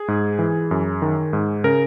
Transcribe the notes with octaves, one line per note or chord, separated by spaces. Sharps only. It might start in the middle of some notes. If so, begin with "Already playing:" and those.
Already playing: G#4
G#2
E3
F#2
D#3
G#2
C#3 A#4